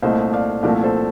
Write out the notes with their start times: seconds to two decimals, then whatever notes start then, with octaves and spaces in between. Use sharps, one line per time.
0.02 C2 A#2 A3 C5 D#5
0.33 D5 F5
0.63 C2 A#2 F3 A3 A#4 D5
0.83 A4 C5